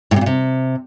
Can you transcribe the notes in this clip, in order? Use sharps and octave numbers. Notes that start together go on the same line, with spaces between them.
A2
C3
A#2
C3